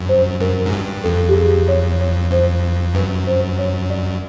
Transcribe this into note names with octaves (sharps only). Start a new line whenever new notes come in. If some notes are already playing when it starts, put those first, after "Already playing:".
Already playing: F#2
C5
F#2 A#4
G#2
G2
F2 A4
G4
G#4
C#5
C#5
F2 C5
F#2 B4
C5
C#5
D5